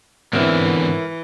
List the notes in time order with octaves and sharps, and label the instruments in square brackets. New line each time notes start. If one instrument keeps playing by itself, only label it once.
[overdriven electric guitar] E2 D3 [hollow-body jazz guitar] G#2 C4 [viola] E3 [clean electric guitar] A#4 C#5 E5